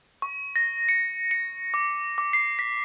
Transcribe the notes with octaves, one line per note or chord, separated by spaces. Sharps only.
C#6
A#6
C#7
C#7
D6
D6
C7
B6